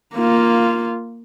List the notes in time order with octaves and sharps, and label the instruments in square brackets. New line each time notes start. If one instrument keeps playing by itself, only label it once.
[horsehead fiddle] A#3 F4